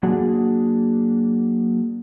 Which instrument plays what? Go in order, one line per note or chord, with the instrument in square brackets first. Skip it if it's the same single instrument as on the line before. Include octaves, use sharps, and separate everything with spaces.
[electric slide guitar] F#3 A#3 D4 F#4 G#4